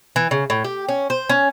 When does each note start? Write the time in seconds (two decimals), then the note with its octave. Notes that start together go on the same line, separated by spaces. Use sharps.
0.16 E3
0.31 C#3
0.50 A2
0.64 G4
0.89 C#4
1.10 C5
1.30 C#4